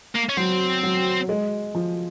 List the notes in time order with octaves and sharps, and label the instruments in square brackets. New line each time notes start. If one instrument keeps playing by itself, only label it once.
[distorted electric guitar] A#3
C#4
[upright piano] F#3 [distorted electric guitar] C4
[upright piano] F#3
G#3
F3